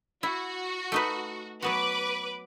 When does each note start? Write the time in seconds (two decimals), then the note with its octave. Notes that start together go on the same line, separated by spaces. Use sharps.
0.23 E4 F#4
0.92 A3 D#4 B4
1.62 F#3 B3 F#4 B4 D6